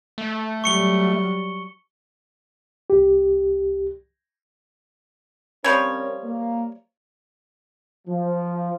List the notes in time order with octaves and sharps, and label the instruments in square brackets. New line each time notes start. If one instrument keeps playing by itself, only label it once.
[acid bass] A3
[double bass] F#3 G3 [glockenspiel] C#6 C#7 G7
[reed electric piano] C2 G4
[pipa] F3 G3 C#5 [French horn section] C4 C#4 A#4
[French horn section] A#3
[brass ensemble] F3